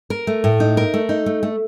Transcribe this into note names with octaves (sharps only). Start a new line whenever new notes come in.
A#4
A3
A2
D#4
A#4
A3
D#4
A3
A3